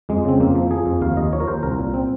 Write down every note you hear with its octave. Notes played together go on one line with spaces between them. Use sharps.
F2 G#3
C#3 C4
F2 A#3
F3
F3 G#4
F2
D#2 F5
D#2 D#5
F3 C#5
A#4
D#2 C5
C2 A#4
A#2
C4